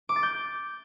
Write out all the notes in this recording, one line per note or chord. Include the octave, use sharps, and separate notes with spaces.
D6
A6
G6